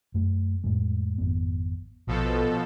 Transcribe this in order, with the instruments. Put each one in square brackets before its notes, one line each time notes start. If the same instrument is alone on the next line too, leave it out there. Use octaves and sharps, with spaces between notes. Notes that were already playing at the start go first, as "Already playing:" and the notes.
[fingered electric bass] F#2 A3
F2 A2 G#3
G#1 F2 B3
[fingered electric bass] A#1 [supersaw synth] B2 F3 A4